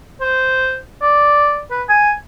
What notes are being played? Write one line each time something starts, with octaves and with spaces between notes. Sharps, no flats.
C5
D5
B4
G#5